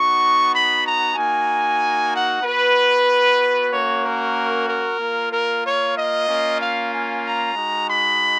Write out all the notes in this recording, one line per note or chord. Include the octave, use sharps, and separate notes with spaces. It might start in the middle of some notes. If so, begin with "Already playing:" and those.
Already playing: B3 D#4 F#4 C#6
B5
A#5
A#3 D#4 F#4 G#5
F#5
B3 F#4 B4
A#3 C#4 F#4 C#5
A#4
A#4
A#3 F4
A#4
C#5
D#5
A#3 C#4 F4
F5
G#5
A#5
G#3 D#4 F#4
B5